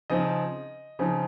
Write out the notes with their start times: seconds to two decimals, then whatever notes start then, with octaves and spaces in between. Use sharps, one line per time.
0.10 C#3 F3 C4 D#4 D#5
0.99 C#3 F3 C4 D#4